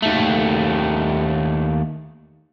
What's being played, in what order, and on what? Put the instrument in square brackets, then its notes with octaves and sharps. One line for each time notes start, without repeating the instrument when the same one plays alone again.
[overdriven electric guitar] D#2 A3